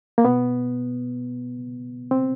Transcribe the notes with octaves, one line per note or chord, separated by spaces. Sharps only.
A#3
B2 B3
C4